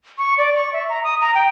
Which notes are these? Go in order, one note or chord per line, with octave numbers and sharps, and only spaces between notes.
C#6
D5
C#6
E5
A#5
D#6
A#5
G5